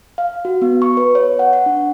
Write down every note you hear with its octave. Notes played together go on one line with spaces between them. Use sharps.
F5
F#4
B3
C#6
B4
C#5
F#5
F#5
D4